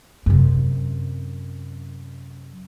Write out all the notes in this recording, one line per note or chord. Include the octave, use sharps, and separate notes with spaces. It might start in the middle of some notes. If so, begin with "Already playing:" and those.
F#2 C3